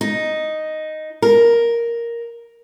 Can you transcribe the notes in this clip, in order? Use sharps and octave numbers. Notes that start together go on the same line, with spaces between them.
D#4
A#4